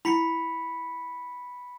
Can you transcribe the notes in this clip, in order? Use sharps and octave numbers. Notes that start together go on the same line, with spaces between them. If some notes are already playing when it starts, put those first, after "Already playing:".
E4 B5 B6 C#7